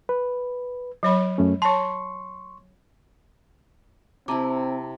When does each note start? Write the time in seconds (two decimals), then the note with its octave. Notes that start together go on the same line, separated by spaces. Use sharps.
0.09 B4
1.03 F#3 C#5 B5
1.38 F#2 A3 C#4
1.62 C#5 A5 C6 C#6
4.28 C3 C4 E4 A5 A#5 D6